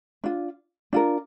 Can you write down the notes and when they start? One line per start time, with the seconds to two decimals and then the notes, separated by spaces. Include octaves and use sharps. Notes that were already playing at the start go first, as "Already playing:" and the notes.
0.24 D4 F4
0.93 D4 F4 A#4